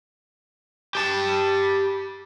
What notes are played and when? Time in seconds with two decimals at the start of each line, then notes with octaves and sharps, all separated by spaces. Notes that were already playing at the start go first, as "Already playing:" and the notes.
0.95 G4 A5